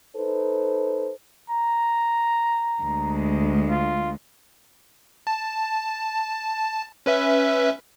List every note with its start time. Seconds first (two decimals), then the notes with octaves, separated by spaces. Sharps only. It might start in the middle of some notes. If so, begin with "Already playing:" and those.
0.16 D#4 A4 B4 C5
1.50 A#5
2.82 D2 G#3
3.70 F4
5.27 A5
7.06 C#4 B4 E5